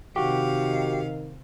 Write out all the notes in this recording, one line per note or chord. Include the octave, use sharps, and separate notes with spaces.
C3 D#3 F#4 G4 F5